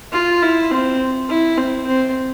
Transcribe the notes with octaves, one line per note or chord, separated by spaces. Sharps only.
F4
E4
C4
E4
C4
C4